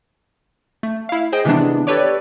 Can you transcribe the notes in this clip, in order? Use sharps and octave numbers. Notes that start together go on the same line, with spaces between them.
A3
E4 F5
G#4 C5 D#5 G5
C3 D#3 E3 G#3 B3 D4
G4 A4 B4 C#5 D5